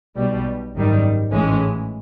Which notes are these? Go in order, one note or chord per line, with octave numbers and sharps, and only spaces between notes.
B1 B2 G3
G#1 F#2 D#3 G3
A1 A2 E3 G#3 C#4